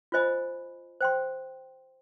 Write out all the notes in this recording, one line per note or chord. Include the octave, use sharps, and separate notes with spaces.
F4 C5 D#5 G#5 B5
C5 G5 C6